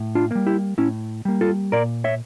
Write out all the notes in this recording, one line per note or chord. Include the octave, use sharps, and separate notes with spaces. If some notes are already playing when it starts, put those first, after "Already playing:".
Already playing: A2
D4 F4
G3 A#3
E4 G4
A2 C#4 E4
G3 A#3
F4 A4
A#2 A#4 D5
C#5 E5